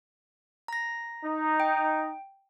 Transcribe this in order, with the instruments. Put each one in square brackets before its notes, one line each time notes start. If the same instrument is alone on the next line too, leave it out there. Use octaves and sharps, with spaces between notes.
[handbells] A#5 A#6
[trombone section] D#4
[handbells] G5